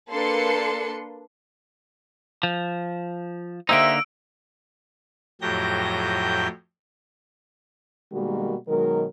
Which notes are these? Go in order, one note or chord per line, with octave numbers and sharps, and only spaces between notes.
A#3 D4 A4 B4 C6 C#7
F3
D3 A#3 D#4 G4 C5 E5 E6 D7
F2 A2 F#3 G4 G6 A#6
B2 D#3 G3 G#3 A#3 F#4
B2 D#3 F#3 G#3 A#4